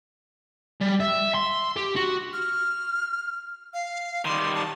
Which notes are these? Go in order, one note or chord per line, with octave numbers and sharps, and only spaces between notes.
G3
E5
C6
G4
F#4
F6
F5
D#3 G3 C6
A5